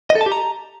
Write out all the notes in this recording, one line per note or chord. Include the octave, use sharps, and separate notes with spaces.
D#5
A4
A5
G4
A#5